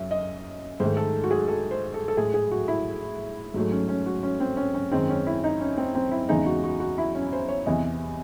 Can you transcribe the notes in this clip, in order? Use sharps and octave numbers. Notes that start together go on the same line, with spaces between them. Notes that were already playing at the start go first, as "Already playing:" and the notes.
Already playing: F#2 C#3 F#3 E5
D#5
G#2 D#3 A3 C5
A4
F#4
G#4
A4
C5
A4
A4
A2 G#3 G#4
G#4
F#4
E4
G#2 F#3 A3
C#4
C#4
F#4
C#4
C4
C#4
C#4
F#2 D#3 G#3 C4
C#4
E4
D#4
C#4
C4
C4
E4
E2 C#3 E3 G#3 D#4
F#4
F#4
F#4
E4
C#4
C5
C#5
E2 C3 E3 D#5